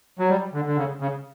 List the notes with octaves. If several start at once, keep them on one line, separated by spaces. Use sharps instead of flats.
F#3
G3
D3
D3
C#3
C#3